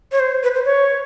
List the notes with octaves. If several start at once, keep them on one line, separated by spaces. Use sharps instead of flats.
C#5
C5
B4
C5
C#5